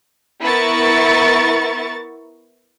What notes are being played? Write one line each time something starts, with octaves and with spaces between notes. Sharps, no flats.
B3 E4 A#4 C#6 A6